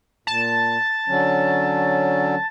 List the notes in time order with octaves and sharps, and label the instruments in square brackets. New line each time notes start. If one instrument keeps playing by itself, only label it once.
[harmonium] A#2 [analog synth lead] A5
[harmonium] D3 F#3 C#4